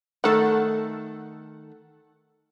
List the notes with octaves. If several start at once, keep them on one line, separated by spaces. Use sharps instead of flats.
D#3 A3 A4 F#5